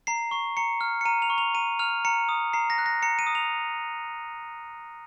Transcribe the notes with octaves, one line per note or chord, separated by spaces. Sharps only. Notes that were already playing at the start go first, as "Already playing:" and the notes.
A#5 C7
C#6 C7
A#5 C#7
F6
C#7
A#5 D#7
F7
C#6
F7
A#5 D#7
F6 F7
A#5 C#7
D#6
A#5 C7
A#6
F#6
A#6
A#5 C#7
D#7
D#6
F7